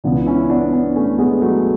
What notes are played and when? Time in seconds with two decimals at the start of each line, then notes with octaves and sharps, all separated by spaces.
0.04 C#2 C#3 E3 B3 D4
0.26 C#4 E4
0.50 B3 D4
0.73 B3 D4
0.96 A3 C#4
1.18 G#3 B3
1.42 F#3 A3